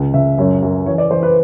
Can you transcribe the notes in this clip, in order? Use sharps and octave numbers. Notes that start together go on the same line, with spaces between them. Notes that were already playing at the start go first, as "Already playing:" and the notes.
Already playing: C#2
C#2 E5
F#2 C#5
F#2
E3 C#5
D5
E3 C5
B4